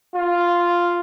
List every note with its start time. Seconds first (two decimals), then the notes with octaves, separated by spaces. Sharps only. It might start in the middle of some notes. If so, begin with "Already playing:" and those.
0.16 F4